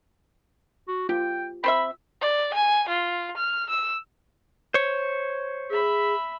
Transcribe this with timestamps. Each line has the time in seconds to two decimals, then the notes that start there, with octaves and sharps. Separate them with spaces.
0.88 F#4
1.09 F4 G4 G5
1.64 C4 C5 E5 B5
2.21 D5
2.54 G#5
2.89 F4
3.37 F6
3.70 E6
4.74 C5 C#5
5.70 G#4 E5 B5